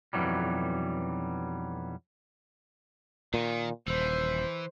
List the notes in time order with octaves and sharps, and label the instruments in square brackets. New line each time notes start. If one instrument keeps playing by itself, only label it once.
[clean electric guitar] B1 F2 G#2 E3 F#3 G3
[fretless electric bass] A#2 [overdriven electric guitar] D#3
[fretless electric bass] D#1 [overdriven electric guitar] E3 [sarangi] C5